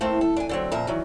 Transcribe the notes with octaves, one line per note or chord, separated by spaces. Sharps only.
A3 A#3 C4 E4
A4
D4 G#5
D3 F#3 C4
F2 A#2 F3 E5 A#5
D#3 E3 F#3